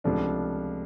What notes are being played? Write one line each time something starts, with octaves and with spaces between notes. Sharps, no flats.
C#2 C3 F3 A3 D4